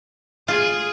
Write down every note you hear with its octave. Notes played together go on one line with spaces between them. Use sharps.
F4 G#4